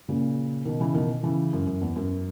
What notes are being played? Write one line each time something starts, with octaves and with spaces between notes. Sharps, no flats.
A#2 C#3
B2 D#3
C#3 E3
B2 D#3
C#3 E3
F#2
F#2
E2
F#2